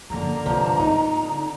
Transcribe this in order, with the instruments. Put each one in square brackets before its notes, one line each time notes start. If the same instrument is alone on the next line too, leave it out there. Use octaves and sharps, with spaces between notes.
[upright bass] F#1 F3 [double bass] D3 A#3 [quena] A#5
[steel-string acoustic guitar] G2 F3 [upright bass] C3 D#3
[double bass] G#2 [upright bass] C4 [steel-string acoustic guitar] D#4
[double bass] D3